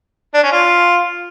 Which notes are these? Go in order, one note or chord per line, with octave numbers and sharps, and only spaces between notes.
D4
C#4
F4